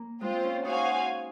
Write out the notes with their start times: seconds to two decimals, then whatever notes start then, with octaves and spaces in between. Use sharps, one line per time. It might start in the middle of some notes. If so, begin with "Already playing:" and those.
Already playing: A#3
0.21 G#3 C4 F4 C5
0.43 C#4
0.65 D#4 F#4 C5 F5 G#5